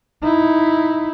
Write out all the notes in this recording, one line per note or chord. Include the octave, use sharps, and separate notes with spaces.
D#4 E4